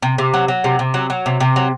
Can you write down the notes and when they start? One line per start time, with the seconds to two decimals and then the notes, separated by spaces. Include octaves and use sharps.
0.02 C3
0.18 C3
0.34 F#3
0.48 F#3
0.64 C3
0.79 C3
0.94 F#3
1.10 F#3
1.26 C3
1.40 C3
1.56 F#3